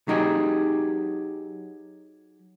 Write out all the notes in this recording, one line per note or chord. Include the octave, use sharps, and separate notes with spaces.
F#3 D#4 G4 G#4